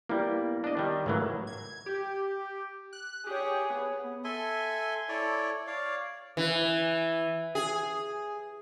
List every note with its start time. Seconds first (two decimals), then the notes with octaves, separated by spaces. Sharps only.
0.09 G3 A#3 B3 E4
0.64 D4 D#5
0.77 D#3 G3
1.06 G#2 C#3 E3 F#3 A3 A#4
1.47 G#6
1.86 G4
2.93 F#6
3.27 G4 G#4 C#5
3.70 B3
4.24 A4 E5 G#5 C6
5.09 E4 A4 C#5 D5
5.67 C#5 D5 F5
6.37 E3
7.55 G#4